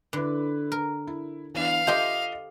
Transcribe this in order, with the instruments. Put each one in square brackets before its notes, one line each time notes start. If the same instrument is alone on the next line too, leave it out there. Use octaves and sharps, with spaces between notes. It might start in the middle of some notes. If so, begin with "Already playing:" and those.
[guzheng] D3 [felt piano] E4 B4
[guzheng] A#4
[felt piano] E4
[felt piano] E3 B3 D4 [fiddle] F5
[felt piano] F4 D#5 E5 [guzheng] G4 A4 C5